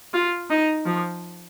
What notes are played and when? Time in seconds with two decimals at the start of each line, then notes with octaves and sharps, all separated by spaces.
0.14 F4
0.50 D#4
0.86 F3